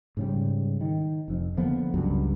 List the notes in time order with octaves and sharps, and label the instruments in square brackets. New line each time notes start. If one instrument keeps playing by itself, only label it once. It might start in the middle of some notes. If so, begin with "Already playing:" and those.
[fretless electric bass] G#2 C#3 G3
D#3
F1 F2
D3 F3 A#3 B3
C#2 G2 F#3